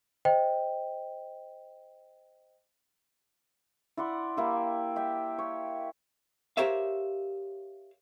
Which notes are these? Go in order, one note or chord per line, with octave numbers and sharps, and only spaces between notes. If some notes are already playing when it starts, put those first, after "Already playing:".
C5 D#5 G5
E4 D5 F#5 C6
A#3 E4 G4
G4 E5 G5
C#5
G4 A#4 C5 C#5 E5 F5